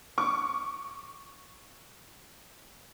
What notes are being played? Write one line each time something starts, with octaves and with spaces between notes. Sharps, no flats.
C#6 D6